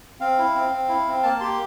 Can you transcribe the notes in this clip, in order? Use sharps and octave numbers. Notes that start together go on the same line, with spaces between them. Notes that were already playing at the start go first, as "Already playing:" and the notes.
C4 F5
E4
C4
C4
E4
C4
A#3 A5
G4 C6